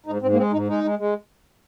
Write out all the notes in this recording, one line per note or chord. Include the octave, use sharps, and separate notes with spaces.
G#2 D#4
G#2 C4
A#3
G#3 C4
G#2 D#4
G#3 D#4
G#3
G#3